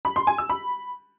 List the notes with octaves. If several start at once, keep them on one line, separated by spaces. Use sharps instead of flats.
B5
C6
G#5
E6
B5